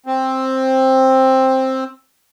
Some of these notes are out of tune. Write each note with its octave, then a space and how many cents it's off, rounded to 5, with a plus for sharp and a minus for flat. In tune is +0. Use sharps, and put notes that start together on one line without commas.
C4 +10